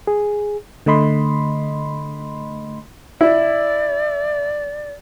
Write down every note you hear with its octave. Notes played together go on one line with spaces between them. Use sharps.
G#4
D3 A3 D#5 B5 C6
E4 D5